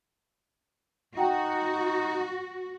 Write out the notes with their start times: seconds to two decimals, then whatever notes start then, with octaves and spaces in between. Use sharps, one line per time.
1.17 D#4 F#4 F#5 G5 A#5